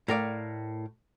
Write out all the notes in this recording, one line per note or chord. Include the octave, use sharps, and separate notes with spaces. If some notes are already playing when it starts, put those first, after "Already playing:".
A2 A#4 D5 F5